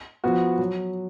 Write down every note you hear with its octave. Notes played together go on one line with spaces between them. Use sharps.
F3 B3 F#4
F#3